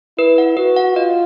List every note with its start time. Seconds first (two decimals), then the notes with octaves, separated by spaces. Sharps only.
0.18 E4 B4
0.38 F#5
0.57 F#4 B4
0.76 F#5
0.96 F4 D#5